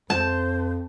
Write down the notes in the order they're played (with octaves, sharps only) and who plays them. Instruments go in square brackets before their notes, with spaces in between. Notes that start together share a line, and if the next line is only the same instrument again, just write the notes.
[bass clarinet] F2 [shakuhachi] C5 [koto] A5